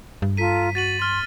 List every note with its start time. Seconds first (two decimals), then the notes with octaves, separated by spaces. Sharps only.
0.22 G2
0.37 F4 A4 A#5 B6 D#7
0.75 F#4 A6 D#7 F#7
1.00 C6 F6 A6